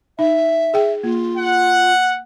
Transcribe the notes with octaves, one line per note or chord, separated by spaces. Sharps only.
D#4 E5
G#4 G5
A#3 F4
F#5